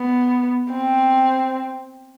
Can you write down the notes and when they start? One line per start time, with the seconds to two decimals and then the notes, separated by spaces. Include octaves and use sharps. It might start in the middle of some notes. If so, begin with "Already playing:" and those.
Already playing: B3
0.72 C4